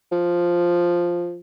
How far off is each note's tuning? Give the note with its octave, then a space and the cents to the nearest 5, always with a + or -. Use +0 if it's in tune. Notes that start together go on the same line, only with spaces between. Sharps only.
F3 +0